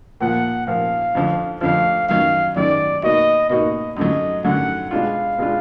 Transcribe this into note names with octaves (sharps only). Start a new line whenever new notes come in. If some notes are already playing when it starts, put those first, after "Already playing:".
A#2 F3 A#3 F#5
A#2 F3 A#3 F5
F2 D3 F3
F2 D3 F3 F5
F#2 D#3 F#3 F5
F#2 D#3 F#3 D5
B2 A#3 D#4 F#4 D#5
B2 A#3 D#4 F#4 D#5
F#2 D3 F#3 D#5
F#2 D3 F#3 F#5
B2 G#3 D4 F4 F5
B2 G#3 D4 F4